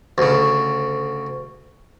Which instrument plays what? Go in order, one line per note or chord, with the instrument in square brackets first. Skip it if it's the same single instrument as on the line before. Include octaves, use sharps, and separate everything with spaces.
[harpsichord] D2 C#3